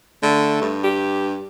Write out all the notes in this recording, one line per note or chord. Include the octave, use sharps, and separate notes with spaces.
D3 A3
G2
G4